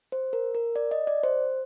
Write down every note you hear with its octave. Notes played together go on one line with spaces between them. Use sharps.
C5
A#4
A#4
D5
D#5
D5
C5